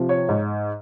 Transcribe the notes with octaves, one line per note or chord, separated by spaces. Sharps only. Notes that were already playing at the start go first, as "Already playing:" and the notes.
Already playing: C3 F3
C#5
G#2